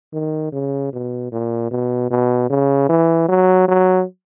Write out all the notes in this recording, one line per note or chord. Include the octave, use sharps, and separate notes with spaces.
D#3
C#3
B2
A#2
B2
B2
C#3
E3
F#3
F#3